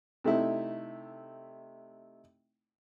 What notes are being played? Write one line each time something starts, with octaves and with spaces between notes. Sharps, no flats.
C3 A3 D#4 E4